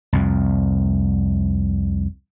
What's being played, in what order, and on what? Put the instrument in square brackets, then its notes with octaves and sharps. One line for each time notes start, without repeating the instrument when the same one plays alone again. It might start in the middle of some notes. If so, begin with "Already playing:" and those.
[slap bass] C2 F2